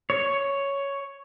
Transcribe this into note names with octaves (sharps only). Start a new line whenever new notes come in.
C#5